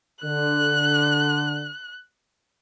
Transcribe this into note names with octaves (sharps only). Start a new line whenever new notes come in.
D3 F#6